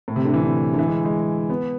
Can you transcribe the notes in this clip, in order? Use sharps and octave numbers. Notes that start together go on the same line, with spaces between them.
A2
C3
D3
E3
D3
D3
E3
G#3
G#3
B3